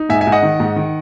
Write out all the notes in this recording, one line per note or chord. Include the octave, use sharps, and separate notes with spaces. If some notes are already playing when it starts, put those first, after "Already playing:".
Already playing: D#4
G#2 E5 G#5
E5 G#5
G#2
D#5 F#5
D#3
G#2
D#3